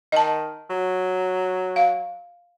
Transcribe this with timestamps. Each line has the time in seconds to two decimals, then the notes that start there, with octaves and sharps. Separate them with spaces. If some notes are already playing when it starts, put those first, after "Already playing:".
0.12 D#3 D#5 A5
0.70 F#3
1.76 F5